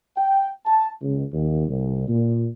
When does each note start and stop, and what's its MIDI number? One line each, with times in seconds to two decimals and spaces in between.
0.17 0.48 79
0.66 0.88 81
1.02 1.23 37
1.33 1.68 39
1.68 2.04 36
2.07 2.47 46